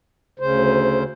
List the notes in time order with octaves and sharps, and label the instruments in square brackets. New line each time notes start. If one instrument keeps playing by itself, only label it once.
[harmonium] D2 C#3 C5